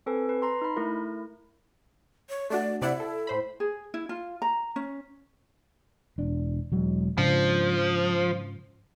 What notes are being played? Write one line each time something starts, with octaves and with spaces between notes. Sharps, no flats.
C4 A4 B4 G#5
B4
A#5 C6
D#4 B5
A3 E4 A#4
C#5
A3 D4 F#4 D5
C3 E4 D5 F#5
A4
A2 C5 B5
G#4
E4
F4
A#5
C#4
E1 D4
E1 F#3 G#3
G#2 C#3 F3 D4